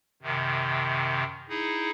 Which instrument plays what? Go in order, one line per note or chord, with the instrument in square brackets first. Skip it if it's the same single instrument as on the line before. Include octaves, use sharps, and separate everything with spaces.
[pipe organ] F#2 C3 D#3
D#4 E4 G#4